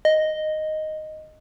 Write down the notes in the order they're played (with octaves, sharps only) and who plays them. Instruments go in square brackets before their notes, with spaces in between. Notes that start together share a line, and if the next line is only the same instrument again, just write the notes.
[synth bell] D#5